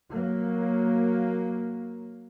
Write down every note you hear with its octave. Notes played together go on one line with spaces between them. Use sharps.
F#3 A#3